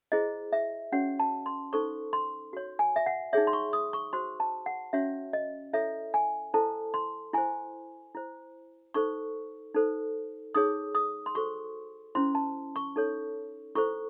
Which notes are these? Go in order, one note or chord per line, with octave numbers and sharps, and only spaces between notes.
E4 G#4 C5 D#5
E5
C#4 F#4 C#5 F#5
A5
C6
D#4 A4 C5 C#6
C6
F#4 C#5
G#5
E5
F#5
D#4 G#4 C#5 E5
C6
C#6
D#6
C#6
F#4 C5 C6
A5
F#5
C#4 F#4 C#5 E5
D#5
E4 A4 C#5 E5
G#5
E4 A4 C5 A5
C6
E4 C5 G#5
E4 C5
D#4 A4 C5 C#6
D#4 A4 C5
D#4 G#4 C#5 D#6
D#6
C6
F#4 A4 C5 C#6
C#4 E4 C5 C6
A5
C#6
D#4 A4 C#5
E4 A4 C5 C#6